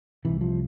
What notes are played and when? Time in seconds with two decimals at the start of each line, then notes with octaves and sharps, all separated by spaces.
0.25 C2 C3 E3
0.41 F3